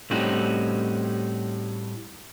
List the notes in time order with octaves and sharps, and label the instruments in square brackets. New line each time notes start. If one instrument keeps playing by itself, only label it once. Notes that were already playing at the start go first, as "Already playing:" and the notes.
[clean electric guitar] A2 G3 C4 C#4 D#4 F#4